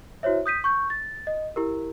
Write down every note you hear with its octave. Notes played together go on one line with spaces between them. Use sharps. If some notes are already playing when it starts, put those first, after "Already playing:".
E4 F#4 C5 C#5 E5
D#6 G6 B6 D#7
C#6 G6
A6
D#5
E4 G4 A#4